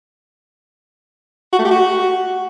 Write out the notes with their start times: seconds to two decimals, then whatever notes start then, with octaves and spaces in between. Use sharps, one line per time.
1.53 F#4
1.59 A3
1.65 G4
1.71 F#4